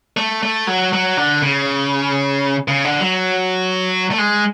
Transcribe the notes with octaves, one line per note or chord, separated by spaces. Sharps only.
A3
A3
F#3
F#3
D3
C#3
C#3
D3
F#3
A3
G#3